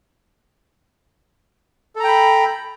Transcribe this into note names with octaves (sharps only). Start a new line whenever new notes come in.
A4 G5 A#5 B5